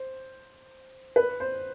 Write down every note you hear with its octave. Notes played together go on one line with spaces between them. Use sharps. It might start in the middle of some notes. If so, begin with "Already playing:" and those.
Already playing: C5
B4
C5